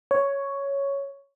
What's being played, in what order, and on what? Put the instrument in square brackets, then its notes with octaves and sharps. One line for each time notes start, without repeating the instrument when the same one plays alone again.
[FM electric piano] C#5